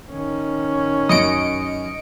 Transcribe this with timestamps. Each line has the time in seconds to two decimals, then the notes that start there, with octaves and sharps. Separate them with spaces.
0.11 D#3 C#4
1.09 F#2 D#5 C#7 D7